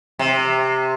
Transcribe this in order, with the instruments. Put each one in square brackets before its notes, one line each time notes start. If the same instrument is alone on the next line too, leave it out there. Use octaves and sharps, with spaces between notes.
[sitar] C3